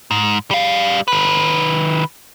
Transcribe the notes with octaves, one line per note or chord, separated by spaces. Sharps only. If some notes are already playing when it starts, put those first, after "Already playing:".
G#2
G3 F5
D#3 B4